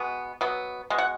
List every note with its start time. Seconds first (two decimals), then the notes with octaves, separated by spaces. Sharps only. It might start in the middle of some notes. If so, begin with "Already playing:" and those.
Already playing: B2 G#3 B3
0.41 B2 F#3 B3
0.90 B2 G#3
0.98 F#5